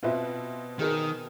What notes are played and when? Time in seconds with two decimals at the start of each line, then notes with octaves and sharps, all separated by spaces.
0.03 B2 C4 F4 B4 E5
0.79 D#3 G#4 A#4